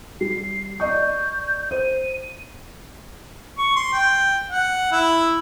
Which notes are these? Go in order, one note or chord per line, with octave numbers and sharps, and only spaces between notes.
G3 C7
D5 D#5 C#6 G6
C5 D#7
C#6
C6
G5
F#5
E4